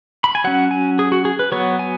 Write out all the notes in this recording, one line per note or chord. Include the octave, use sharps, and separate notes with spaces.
B5
G#5
F#3 C#4 F#5
G#5
G#4
F#4
G#4
B4
F#3 B3 C#5
G#5